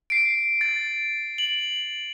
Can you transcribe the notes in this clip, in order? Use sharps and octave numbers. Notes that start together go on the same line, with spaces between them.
C7 D7
A6
F#7